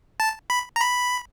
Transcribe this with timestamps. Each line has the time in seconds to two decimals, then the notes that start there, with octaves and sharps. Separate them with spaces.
0.20 A5
0.50 B5
0.76 A#5
0.80 B5